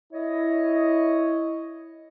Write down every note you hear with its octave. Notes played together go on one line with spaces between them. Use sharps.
E4 C#5 D#5